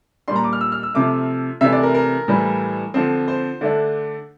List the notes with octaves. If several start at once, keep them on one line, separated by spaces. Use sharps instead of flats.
A#2 G3 D4 C6
A#5
D6
F6
E6
F6
E6
C3 F3 A3 D6
C3 E3 A3 D4 E5
D5
A#4
A#4
A2 E3 G3 D4
D3 F3 C4
C5
D3 A3 D4